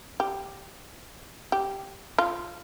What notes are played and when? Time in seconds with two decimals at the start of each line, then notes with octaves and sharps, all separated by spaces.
0.20 G4
1.52 G4
2.18 F4